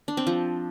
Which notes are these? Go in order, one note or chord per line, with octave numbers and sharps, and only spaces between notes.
D4
C4
F3